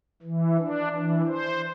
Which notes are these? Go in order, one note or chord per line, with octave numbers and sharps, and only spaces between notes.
E3
D4
E3
C5